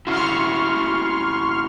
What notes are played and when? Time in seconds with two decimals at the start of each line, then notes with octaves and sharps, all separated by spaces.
0.07 C#4 E4 F#4 C6 C#6 F6